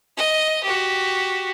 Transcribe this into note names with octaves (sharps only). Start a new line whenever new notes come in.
D#5
F#4 G4